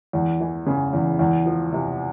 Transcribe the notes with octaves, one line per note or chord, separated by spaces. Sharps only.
E2
E3
C#3
E2
E2
F3
C3